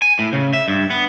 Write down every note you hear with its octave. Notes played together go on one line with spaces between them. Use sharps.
G#5
A2
C#3
E5
G2
B3